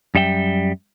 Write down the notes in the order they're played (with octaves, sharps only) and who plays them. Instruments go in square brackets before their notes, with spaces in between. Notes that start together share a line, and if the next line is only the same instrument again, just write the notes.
[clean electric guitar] F#2 G3 E5 G5